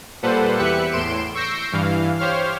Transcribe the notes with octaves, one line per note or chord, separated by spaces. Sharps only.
A#2 G3 A4 B4 C5 F#5
E2 G4 B4 E5 F#6 C#7
E2 A2 C6 D7 E7
C#6 E6 G6 A#6 C7 D7
G2 E3 F5
G4 C5 C#5 F5 F6